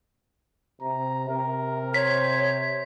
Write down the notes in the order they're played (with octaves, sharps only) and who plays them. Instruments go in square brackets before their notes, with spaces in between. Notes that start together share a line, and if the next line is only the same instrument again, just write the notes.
[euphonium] C3 [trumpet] A#5
[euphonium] C3 [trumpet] A#4
[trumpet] C5 [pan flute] C#5 [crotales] B6